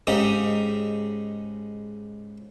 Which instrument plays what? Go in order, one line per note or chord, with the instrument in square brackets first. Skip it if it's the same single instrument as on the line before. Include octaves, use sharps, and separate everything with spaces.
[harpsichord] G#2 C#3 D#4 G4 D#6